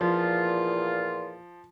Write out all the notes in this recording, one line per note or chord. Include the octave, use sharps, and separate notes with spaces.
E2 A#2 F3 F4